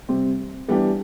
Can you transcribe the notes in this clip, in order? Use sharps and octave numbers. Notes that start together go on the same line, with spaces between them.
C3 G3 C4
E3 G3 B3 D4 G4